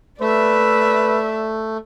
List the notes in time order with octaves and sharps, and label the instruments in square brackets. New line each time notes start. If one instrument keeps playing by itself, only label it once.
[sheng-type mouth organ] A3 [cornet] B4 [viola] D5 E5